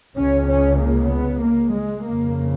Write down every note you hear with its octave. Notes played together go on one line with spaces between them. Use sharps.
C#2 C#3 C#4
C#4
A#3
B3
A#3
G#3
F2 C#3 A#3